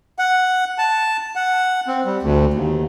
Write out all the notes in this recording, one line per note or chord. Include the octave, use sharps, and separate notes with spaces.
F#5
A5
F#5
C4
G3
D2
D#2